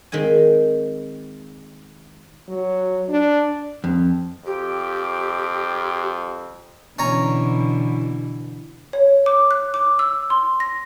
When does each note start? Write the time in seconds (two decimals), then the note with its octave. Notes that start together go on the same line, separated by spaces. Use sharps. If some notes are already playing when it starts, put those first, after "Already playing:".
0.12 D#3 G#3 C4 G#5
2.49 F#3
3.09 D4
3.84 F2
4.46 F2 G4
6.99 B2 D3 E3 C#4 C#5 A#5
8.93 C#5
9.26 D6
9.51 F#6
9.74 D6
9.99 E6
10.30 C6
10.60 A#6